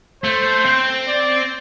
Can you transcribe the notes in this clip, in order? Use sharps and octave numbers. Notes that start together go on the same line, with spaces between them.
A3 C5
C4
D5